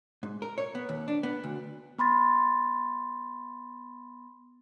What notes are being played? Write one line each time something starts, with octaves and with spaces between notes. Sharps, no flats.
G#2
A#4
C#5
B3
D#2
D4
B3
D2
B3 B5 C6 A6